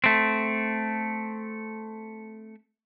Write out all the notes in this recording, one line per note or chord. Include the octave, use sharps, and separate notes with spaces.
A3 C4